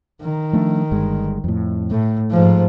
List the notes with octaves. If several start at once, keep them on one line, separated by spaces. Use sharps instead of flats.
D#3
F3 A3 D4
G1 G2 G#3
F2 A2
A2 A3
G#2 F3